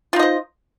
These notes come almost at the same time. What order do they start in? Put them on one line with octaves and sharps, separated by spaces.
F4 D#4 D#5 C5